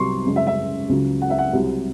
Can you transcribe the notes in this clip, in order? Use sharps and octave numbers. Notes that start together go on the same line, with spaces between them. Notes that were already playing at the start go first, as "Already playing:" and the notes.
Already playing: C2 C3 F#3 C6 C#6
F#2 C#3 G#3
E5
E5
C#2 C#3 F#3
F#5
E5
F#5
C2 C3 F#3